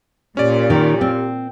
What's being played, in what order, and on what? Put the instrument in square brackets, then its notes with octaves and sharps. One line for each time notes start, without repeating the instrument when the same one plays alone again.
[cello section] A#2 [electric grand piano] C#4 D5 [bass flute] G4
[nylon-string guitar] D#3
C4